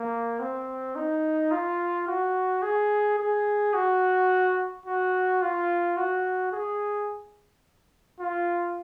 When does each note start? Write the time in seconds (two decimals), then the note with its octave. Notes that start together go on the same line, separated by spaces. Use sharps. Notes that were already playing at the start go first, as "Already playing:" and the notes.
Already playing: A#3
0.40 C4
0.95 D#4
1.51 F4
2.07 F#4
2.62 G#4
3.18 G#4
3.74 F#4
4.86 F#4
5.42 F4
5.97 F#4
6.52 G#4
8.20 F4